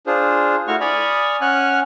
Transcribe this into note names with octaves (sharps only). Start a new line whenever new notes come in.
D4 F4 G#4 C5
A3 E4 F#4 C#6 F6
D5 G#5 B5 C#6 D#6 F6
C#4 F#5 G#5 F6 F#6